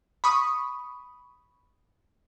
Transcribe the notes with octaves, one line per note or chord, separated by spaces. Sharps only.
B5 C#6 D#6